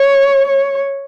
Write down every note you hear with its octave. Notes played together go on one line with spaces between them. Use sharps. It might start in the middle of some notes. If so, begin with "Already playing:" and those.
Already playing: C#5
C#5